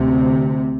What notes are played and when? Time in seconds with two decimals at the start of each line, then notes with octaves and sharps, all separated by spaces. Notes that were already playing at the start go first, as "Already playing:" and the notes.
Already playing: D2 C3